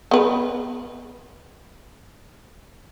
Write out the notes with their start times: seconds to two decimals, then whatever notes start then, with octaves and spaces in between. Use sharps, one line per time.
0.11 B3 B4